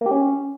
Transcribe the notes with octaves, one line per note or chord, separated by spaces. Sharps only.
A#3
G4
C#4